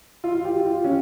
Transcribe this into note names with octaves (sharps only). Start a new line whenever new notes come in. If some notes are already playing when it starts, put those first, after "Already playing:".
F4
F4
G4
F4
F4
C#4